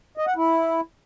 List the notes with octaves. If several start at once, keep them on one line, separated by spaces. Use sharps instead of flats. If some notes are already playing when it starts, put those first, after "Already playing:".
D#5
F#5
E4